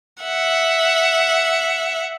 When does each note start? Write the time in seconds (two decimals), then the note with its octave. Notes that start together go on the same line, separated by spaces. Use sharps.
0.23 E5 F#5